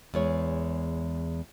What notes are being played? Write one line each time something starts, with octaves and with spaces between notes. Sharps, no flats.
E2 G#3 C#5